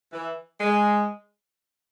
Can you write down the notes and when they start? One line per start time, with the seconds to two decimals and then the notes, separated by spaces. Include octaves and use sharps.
0.13 E3
0.61 G#3